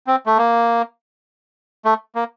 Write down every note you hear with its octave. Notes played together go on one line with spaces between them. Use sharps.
C4
A3
A#3
A3
A#3